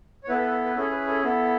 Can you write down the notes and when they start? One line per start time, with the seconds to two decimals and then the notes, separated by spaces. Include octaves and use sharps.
0.24 C#5
0.28 B3 E4 A4 B4
0.40 B4
0.65 B4
0.76 C#4 E4 G#4 A4
0.92 B4
1.08 A4
1.23 B3 E4 A4